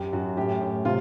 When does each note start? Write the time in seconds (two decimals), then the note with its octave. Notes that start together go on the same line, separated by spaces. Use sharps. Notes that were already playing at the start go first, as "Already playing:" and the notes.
Already playing: F#2 G4
0.13 F#2 F#4
0.37 A2 G4
0.61 A2
0.85 C3 F4